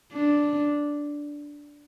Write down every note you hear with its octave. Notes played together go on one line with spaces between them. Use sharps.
D4